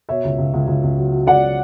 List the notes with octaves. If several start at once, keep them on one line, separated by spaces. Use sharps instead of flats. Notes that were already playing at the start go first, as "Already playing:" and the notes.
B2 C#5 E5
C#2
C#2
C#2
C#2
C#2
F#3
F#3
C#2 D5 F#5
F#3